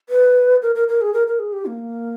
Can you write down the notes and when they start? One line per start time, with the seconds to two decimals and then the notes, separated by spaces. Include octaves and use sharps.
0.09 B4
0.62 A#4
0.75 A#4
0.88 A#4
1.01 G#4
1.14 A#4
1.27 A#4
1.39 G#4
1.53 G4
1.66 A#3